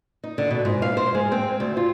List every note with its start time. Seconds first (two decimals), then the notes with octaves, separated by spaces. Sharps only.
0.24 D#4
0.38 D3
0.51 B2
0.65 G#2
0.82 F5
0.97 C5
1.15 G#3
1.32 C4
1.60 D2
1.77 F4